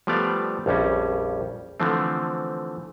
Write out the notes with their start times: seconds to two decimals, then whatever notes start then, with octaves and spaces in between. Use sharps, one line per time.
0.07 F3 G3 A3 B3 D5 F5
0.66 A#1 F2 G3 C#4
1.80 D3 E3 F3 A3 C4